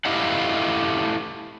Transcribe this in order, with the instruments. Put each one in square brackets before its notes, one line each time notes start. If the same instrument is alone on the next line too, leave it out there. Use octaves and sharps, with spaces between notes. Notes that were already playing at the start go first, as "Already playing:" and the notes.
[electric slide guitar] A3 E4 G4 D#5 F5 F#5